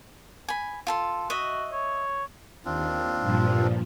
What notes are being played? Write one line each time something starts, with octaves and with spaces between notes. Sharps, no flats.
G#5 B5
F4 A4 C6
F#4 D#5 E5
C#5
D#2 C4 D4 F4
G2 A#2 F3